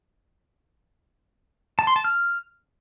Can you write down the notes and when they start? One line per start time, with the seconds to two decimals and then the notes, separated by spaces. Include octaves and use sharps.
1.79 A5
1.87 C6
1.96 A5
2.05 F6